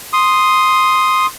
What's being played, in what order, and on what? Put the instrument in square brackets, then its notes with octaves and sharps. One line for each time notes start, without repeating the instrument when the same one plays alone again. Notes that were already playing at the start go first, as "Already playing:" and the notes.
[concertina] C6 D#6